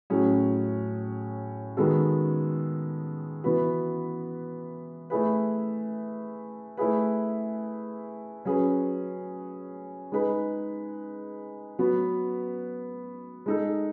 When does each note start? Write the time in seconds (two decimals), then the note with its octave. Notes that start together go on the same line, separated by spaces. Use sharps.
0.10 A2 F#3 C#4 G#4
1.77 D#3 G#3 B3 F#4 A4
3.44 E3 B3 F#4 B4
5.10 A3 E4 G#4 B4
6.77 A3 E4 G#4 B4
8.45 F#3 C#4 G#4 B4
10.12 G#3 D#4 G#4 B4
11.79 F#3 B3 F#4 B4
13.46 G#3 D#4 A4